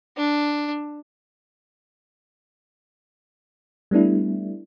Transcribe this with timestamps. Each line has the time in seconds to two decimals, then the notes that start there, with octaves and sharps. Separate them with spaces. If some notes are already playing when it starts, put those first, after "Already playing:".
0.17 D4
3.91 G3 A3 B3 D4 E4